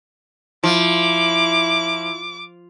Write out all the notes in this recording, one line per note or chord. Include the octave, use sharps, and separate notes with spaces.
F3 E4 D6